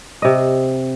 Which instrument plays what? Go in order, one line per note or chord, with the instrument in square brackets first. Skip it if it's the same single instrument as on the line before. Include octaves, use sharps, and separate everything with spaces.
[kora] C3 D#5